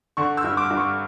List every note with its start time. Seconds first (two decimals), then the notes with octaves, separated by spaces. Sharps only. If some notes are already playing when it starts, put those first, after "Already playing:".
0.17 D3 C#6
0.37 E6
0.44 G2
0.57 D6
0.70 G2
0.77 C#6